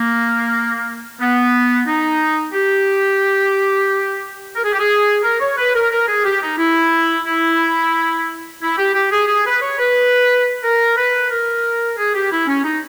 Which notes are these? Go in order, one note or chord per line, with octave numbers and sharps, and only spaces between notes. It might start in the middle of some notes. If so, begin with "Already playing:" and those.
Already playing: A#3
B3
D#4
G4
A#4
G#4
G4
G#4
A#4
C#5
B4
A#4
A#4
G#4
G4
D#4
E4
E4
E4
G4
G4
G#4
G#4
B4
C#5
B4
A#4
B4
A#4
G#4
G4
E4
C#4
D#4